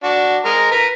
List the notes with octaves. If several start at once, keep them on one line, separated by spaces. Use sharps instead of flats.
D4 F#4
G#3 A#4 A#5
A#4 B4 A#5